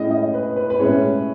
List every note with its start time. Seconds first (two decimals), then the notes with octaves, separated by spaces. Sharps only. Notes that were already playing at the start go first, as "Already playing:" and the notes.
Already playing: A2 G#3 C#4 E4 D#5
0.10 D#5
0.34 B4
0.56 B4
0.70 B4
0.79 A2 G#3 C#4 E4 C#5